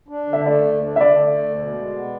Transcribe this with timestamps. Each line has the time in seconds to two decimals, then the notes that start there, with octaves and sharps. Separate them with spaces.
0.08 D4
0.27 D3
0.33 E5
0.45 A3 D5
0.65 D2
0.82 D4
0.96 E5
1.01 D3 D5
1.20 A3
1.38 D2
1.56 B2
1.76 G#3
1.94 B3